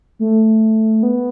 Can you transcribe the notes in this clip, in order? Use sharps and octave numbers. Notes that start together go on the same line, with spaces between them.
A3
B3